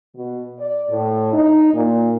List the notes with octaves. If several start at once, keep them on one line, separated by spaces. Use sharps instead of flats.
B2
D5
A2
D#4
A#2